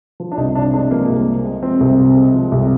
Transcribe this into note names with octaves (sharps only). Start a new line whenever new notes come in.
F3
D4
C2 D#4
C3 D4
G#3 D4
F3 A#3
C2
C3
G#3
F3 C4
C2
C3
G#3
F3
C2